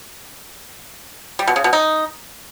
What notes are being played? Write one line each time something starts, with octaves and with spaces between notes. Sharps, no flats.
G3
B2
C#3
B2
D#4